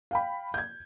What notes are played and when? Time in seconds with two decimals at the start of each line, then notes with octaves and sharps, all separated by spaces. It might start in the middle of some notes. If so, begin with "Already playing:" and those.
0.11 F5 G5 B5
0.54 G6 G#6